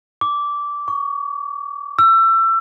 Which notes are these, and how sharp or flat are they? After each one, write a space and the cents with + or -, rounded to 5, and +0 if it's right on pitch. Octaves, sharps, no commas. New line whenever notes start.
D6 -15
C#6 +25
E6 +30